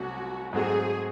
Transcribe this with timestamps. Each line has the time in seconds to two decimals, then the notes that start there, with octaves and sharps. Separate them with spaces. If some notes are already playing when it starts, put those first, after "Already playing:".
Already playing: C2 C3 F#3 A3 C#4 F#4
0.53 G#2 F#3 A3 C4 F#4 G#4